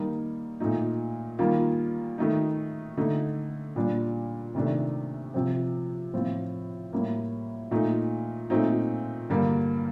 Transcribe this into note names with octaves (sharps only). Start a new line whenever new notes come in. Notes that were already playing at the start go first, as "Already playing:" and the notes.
Already playing: D#3 G3 A#3 D#4
A#2 A3 D#4
D#3 G3 A#3 F4
D#3 A3 D#4
D3 A3 D#4
A#2 G3 D4
C3 D#3 A3 D4
C3 F3 C4
A2 F3 C4 F4
A2 G3 A#3
A#2 A3 D#4
A#2 A3 C4 D#4
G2 D3 G3 A#3